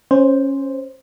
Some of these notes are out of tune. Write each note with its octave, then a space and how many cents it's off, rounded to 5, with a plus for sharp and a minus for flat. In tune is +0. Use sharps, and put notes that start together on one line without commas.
C#4 -15 C5 +0